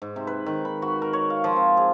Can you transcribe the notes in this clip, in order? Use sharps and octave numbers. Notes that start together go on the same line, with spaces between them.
G#2
C3
B4
D#3
B5
F#4
A#4
C#5
F5
F3
C4
G#4